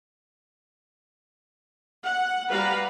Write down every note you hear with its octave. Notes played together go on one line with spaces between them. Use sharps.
F#5
G3 B4 F5 F#5 A#5